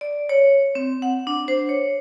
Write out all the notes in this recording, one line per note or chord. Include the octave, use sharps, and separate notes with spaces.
D5
C#5
C4
F#5
D4
C5
C#5